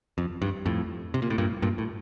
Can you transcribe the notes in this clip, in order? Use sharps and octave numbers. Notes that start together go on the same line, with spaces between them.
F2
G2
F2 A2
C3
A#2
A2
G2 A#2
G2 A#2
A2